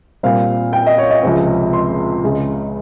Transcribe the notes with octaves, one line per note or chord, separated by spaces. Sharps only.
A#2 G3 C4 F5
G5
D#5
C#5
D#5
C#2 C3 F3 G#3 C4
C6
C#2 C#3 G#3